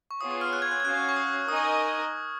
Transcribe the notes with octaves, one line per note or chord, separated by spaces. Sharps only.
C#6
B3 F4 G#4 C#5 D#6
D#6
F6
F#6
G#6
F#6
G#6
C#4 F#4 C#5 F5 G#5 F#6
C#6
D#6
D#4 A#4 D#5 G#5 D#6
C#6
C#6